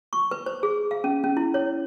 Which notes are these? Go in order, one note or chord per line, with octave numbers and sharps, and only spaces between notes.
C#6
B4
C5
G#4
F5
C#4
C#4
E4
C#5